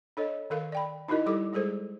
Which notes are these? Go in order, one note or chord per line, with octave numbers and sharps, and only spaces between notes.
D4 A4 C#5 D#5
D#3 A4 A#4 F5
D5 G5 B5
D#4 E4 F#4 A#4 D#5
G3 E4 G4 A4 D6
G3 G#3 G#4 A4 C5